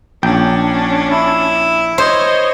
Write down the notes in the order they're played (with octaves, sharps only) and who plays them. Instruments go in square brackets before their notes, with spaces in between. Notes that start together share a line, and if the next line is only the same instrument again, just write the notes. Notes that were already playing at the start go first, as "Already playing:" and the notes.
[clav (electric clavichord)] A#1 G5 [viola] C#4 D4
[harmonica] E4
[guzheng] C5 [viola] C#5 D#5